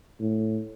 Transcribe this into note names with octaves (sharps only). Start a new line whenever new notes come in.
A2